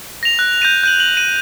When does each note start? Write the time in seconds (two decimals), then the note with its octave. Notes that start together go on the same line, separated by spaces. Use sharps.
0.23 A#6 F7
0.39 F#6
0.62 G6 A#6 D#7
0.84 G6 D#7 F#7
1.00 F#7
1.17 D#7